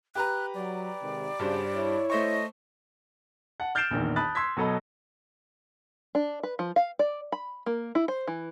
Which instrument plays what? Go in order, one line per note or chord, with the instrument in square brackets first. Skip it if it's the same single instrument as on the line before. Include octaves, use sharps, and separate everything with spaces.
[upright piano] G4 B4 A#5 [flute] F#6
[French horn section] F#3 [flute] D5
[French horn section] G#2 C3 D#3
[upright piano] G2 G3 C5 [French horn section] C#3 F#4
[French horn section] E4 C#5
[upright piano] A3 C5 C#6 [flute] D#5
[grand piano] F#5 A5
F6 G6 A6 C7 D7 E7
A#1 E2 D#3
A5 B5 D#6 F#6 A6
C6 E6 G#6 B6
B2 F#3 A4 D#5 B5
[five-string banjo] D4
B4
F3
F5
D5
B5
A#3
E4
C5
E3